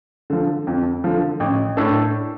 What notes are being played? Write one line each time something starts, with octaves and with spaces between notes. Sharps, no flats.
D3 F3
F2
D3 F3
A1
A2 A3 D4 A4